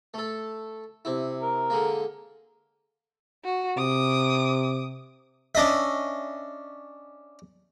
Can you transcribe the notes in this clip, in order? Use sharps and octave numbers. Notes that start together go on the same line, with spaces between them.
A3 A4
C3 E4
A#4
D3 G#3 A#3
F#4
C3 D6 D#6
C#4 D4 D#5 E5